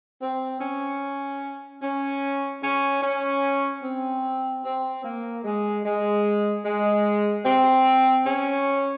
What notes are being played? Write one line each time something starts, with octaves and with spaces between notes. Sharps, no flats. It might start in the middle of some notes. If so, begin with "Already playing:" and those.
C4
C#4
C#4
C#4
C#4
C4
C4
A#3
G#3
G#3
G#3
C4
C#4